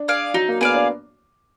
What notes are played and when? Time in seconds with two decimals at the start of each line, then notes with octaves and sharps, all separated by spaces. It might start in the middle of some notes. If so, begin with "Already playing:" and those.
Already playing: D4
0.08 G#4 D5 F5
0.34 F#3 D#4
0.48 A#3
0.61 B3 G#4 D5 F5
0.74 D4